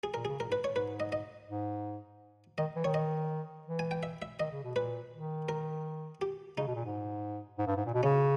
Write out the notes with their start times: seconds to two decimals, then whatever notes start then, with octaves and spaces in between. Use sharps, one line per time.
0.03 G#4
0.14 A#2 A#4
0.25 C#3 G#4
0.40 A#2 A#4
0.49 G#2
0.52 B4
0.64 G#2 C#5
0.76 B4
1.00 D#5
1.12 D#5
1.49 G#2
2.58 D#3 D#5
2.76 E3
2.84 D#3 C#5
2.94 D#5
3.67 E3
3.79 G#5
3.91 G5
4.03 E5
4.22 E5
4.40 D#3 D#5
4.52 C#3
4.64 B2
4.76 A#2 B4
5.12 D#3
5.49 A#4
6.21 G4
6.57 C#3 D#4
6.67 B2
6.75 A#2
6.85 G#2
7.58 G#2
7.67 G2
7.76 G#2
7.86 A#2
7.94 B2
8.03 C#3 C#4